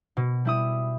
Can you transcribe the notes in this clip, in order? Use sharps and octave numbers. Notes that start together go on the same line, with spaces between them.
B2
G3 E4 D#6